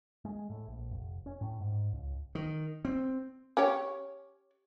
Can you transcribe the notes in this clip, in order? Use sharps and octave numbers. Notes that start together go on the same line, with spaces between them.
G#3
A2
A#1
F1
C#4
A2
G#2
C#2
D#3
C4
C#4 G4 C#5